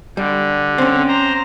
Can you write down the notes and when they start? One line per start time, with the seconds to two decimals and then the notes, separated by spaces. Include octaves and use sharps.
0.17 D3 G3
0.78 C4 C#4
1.08 C5 A#5